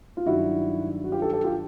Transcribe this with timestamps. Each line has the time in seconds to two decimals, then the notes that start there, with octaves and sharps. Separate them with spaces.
0.17 F4
0.26 G2 D#3 F#3 E4 F#4
1.04 F#4
1.12 F4 G4
1.22 G4 A4
1.33 G4 A4
1.44 F4 G4